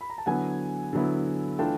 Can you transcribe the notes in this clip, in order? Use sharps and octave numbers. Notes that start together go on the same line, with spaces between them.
B5
A#5
A5
D3 F#3 B3 E4 F#5 G#5
D3 F#3 B3 E4
E3 A3 D4 F4 G5 A5